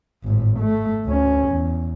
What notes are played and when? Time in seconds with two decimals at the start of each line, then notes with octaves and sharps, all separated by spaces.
0.24 G#1 A2
0.59 A3
1.06 D2 C#4
1.48 E2